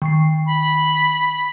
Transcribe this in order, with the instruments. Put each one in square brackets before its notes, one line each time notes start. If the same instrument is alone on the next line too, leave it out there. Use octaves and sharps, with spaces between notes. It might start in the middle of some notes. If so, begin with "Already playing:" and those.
[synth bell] D#3 C#6 C7
[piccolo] B5